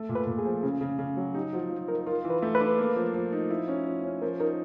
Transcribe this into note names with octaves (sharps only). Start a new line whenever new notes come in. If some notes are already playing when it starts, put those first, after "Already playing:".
Already playing: A3
A#2
B4
A#2
G#4
F3
C#3
C#3
C#3
F#3
D#4 G4
F3 F#4
F3 F4
D#4 A#4
F4 A#4
E3
B4
A3
B4
D4
A#3
F3
F3
D#4
E4
C#4
F3
C#4
F3 A#4
D#4 A#4